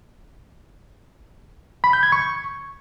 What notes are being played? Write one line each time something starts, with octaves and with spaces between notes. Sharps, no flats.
B5
G6
G#6
C#6